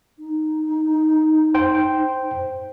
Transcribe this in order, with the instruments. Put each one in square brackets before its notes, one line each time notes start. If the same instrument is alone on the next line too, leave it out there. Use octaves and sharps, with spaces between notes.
[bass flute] D#4
[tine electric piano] C5 G5